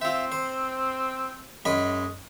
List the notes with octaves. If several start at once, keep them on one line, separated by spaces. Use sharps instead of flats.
C4 F4 E5
C5
F#2 G#3 D#5 B5